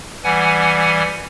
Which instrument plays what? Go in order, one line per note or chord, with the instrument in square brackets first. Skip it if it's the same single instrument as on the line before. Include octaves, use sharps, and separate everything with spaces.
[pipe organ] E3 G3 F#5 G#5